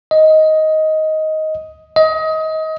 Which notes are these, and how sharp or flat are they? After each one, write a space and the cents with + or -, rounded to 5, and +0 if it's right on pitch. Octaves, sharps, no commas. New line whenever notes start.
D#5 +10
D#5 +25